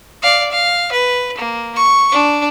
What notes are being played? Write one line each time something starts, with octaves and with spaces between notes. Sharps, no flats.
D5 F5
F5
B4
A#3
C#6
D4